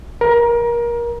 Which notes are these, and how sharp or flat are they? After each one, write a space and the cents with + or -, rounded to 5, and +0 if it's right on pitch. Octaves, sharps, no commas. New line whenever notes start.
A#4 +25